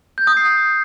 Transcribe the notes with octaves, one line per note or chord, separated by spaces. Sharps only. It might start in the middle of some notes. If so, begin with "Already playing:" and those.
G6
D#6
C7